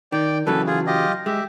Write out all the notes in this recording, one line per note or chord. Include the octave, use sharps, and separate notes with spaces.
D#3 D5 G5
C#3 E3 F#3 A4 B4
F4 G#4
F4 G4 D#5
G#3 G4 E5